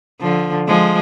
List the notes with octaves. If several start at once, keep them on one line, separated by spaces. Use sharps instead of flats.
D3 F3
F3 G#3